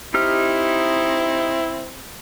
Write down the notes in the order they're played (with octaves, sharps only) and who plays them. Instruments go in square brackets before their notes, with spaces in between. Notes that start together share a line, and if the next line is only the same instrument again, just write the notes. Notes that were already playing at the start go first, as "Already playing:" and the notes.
[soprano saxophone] C4 [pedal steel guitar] D#4 G4 F6 [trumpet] E4